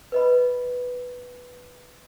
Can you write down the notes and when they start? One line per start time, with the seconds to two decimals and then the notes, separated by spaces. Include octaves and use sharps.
0.12 B4 D#5 B5